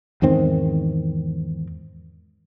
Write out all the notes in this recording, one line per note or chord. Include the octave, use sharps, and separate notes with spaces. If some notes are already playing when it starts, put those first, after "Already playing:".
E2 G#2 D#3 C4